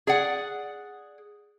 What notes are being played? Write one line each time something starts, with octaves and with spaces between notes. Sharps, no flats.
G#4 D5 F#5